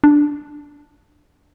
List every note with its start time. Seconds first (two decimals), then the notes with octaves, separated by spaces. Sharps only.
0.04 D4